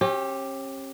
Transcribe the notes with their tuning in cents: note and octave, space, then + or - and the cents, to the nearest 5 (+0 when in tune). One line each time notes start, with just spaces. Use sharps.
C#4 -40 G4 +0